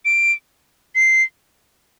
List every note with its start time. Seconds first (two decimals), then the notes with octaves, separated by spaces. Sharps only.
0.05 D7
0.95 C7